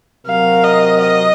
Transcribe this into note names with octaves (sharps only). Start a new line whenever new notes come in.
C3 F#3 C4 F#4 A#4 F5
D#5
D#5